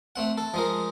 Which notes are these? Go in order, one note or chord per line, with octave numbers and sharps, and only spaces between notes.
A3 C4 F#5
A4
F3 G#3 A#4